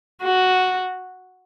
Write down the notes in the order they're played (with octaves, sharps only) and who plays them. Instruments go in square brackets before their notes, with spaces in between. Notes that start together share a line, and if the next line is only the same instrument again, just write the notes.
[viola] F#4